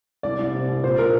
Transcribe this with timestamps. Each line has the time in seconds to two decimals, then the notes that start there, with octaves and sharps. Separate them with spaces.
0.23 C2 D5
0.39 C2
0.54 C3
0.68 C2
0.84 A#2 C5
0.98 A#2 A#4